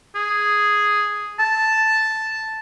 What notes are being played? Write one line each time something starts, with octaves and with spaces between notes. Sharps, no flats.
G#4
A5